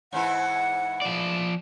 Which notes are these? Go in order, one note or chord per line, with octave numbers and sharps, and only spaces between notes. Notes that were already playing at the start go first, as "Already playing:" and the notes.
G#2 E3 E4 F#5
F3 D5